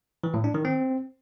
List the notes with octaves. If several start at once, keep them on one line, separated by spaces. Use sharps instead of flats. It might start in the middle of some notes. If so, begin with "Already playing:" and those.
E3
A2
D4
D#3
C4